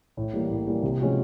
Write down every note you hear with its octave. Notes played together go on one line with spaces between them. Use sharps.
A2
E3 G3 A#3
A2
E3 G3 A#3
C3
F3 G#3 C#4 F#4